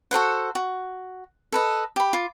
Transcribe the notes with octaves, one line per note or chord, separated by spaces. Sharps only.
F#4 A4 C5 F#5
F#4
A4 B4 D#5
G4 B5
F4 D6